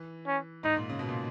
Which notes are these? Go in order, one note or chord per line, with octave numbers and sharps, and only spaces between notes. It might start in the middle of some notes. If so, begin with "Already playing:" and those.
Already playing: E3
C#4
G#2 D#4
A#2
C#3
B2
A#2